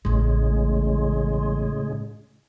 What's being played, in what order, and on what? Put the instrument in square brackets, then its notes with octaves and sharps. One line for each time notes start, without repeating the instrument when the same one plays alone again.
[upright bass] A1 E2 [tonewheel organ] A2 C#3 G#3